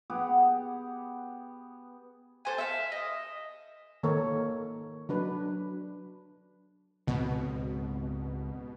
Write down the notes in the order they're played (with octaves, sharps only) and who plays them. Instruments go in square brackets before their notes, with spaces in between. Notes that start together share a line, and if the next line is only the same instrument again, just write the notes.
[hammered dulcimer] B3 G4 G#4 F#5
[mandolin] A4 C5 G#5
E5 F5
D#5
[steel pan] D#3 A#3 A4 A#4 C#5
F#3 D4 B4
[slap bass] C#2 G#2 C4 [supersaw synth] B2